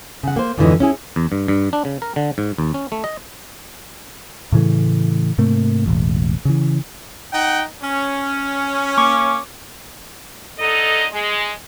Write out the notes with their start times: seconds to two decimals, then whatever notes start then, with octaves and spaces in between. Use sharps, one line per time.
0.23 C#3 F#5
0.36 A#3 C5
0.58 F2 G#2 D3 E3 F#3 D#5
0.80 C#4 E4 G#4
1.16 E2
1.32 G2
1.48 G2
1.73 D4
1.85 C#3
2.02 A#4
2.16 D3
2.38 G#2
2.58 D#2
2.74 C#4
2.92 A3
3.04 D#5
4.52 A2 C#3 E3 A3
5.38 G#2 C3 A3 A#3
5.86 E1 A1
6.45 C#3 E3
7.33 D#4 F#5 G5
7.83 C#4
8.97 A#3 C#6 D6
10.59 D3 D#4 A4 D#5
11.11 G#3